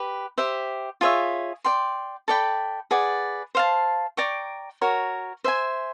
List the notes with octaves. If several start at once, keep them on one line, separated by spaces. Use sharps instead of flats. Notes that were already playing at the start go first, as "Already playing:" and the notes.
Already playing: G4 B4
G4 C5 E5
F4 G#4 C#5 E5
D5 G5 C6
A4 D5 G5 B5
G#4 B4 D5 F#5
C5 F5 A5
D5 G5 A#5 C#6
F#4 A#4 C#5
C5 E5 G#5